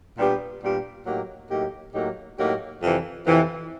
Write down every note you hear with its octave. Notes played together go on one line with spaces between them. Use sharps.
A#2 G3 B3 D4 G4
A#2 G3 B3 D4 G4
A2 F#3 A#3 D#4 G4
A2 F#3 A#3 D#4 G4
A2 F#3 A#3 D#4 G4
A2 F#3 A#3 D#4 G4
F2 C3 E3
F2 C3 E3